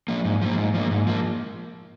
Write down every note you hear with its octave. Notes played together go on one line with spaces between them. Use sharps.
F3 A#3
G#2
F3 A#3
G#2
F3 A#3
G#2
F3 A#3